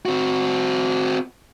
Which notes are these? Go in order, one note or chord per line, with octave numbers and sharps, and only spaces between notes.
C4 F#4